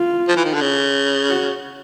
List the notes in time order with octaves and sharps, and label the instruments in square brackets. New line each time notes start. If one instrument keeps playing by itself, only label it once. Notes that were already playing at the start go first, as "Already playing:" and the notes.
Already playing: [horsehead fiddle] F4
[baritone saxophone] F3
E3
D#3
D3
C#3
[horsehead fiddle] F#4